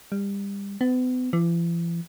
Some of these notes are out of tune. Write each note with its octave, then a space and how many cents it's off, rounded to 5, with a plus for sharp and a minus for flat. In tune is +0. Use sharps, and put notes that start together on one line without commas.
G3 +30
B3 +40
E3 +45